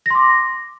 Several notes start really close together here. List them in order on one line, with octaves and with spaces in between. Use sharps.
A#6 C6 D6